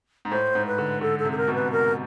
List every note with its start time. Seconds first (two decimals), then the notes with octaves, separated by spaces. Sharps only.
0.25 G#2
0.32 A2 C5
0.55 G#2
0.67 B4
0.78 D3
1.01 D3 A4
1.19 A4
1.25 C3
1.32 A4
1.37 A#4
1.48 B2
1.55 B4
1.72 A#4